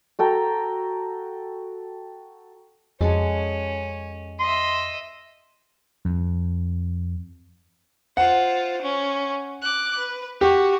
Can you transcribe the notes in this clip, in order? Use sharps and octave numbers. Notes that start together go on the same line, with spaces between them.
F#4 A4 G5 A#5
F2 G#3 C#4 F#4 A4
D#5 E5 C6
F2
F4 C5 F#5
C#4
D6 F#6
B4
F#4 G4